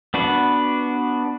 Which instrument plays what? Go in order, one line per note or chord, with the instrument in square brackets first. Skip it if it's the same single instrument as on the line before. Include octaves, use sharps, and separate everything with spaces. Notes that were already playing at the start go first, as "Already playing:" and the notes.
[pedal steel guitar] B3 D4 F#4 B4